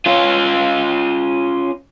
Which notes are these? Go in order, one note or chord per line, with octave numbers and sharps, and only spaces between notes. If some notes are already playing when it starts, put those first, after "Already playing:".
C#4 F4